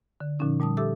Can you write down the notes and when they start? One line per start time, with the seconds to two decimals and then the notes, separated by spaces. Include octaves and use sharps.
0.20 D3
0.39 A#2 D3 F3 C#4 D#4
0.59 A#2 G3 A5 D#6
0.77 G4 A4 E5 D6 E6